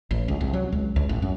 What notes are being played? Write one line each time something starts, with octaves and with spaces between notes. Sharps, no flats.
A1
C#2
C2
F#3
C#2
C#2
A1
F#2